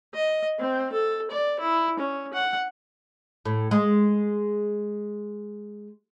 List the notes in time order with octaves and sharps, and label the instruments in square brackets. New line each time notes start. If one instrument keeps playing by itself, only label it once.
[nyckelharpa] D#5
C4
A4
D5
E4
C#4
F#5
[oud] A2
G#3